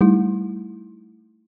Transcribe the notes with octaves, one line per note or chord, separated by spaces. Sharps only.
G3 A3 D#4 E4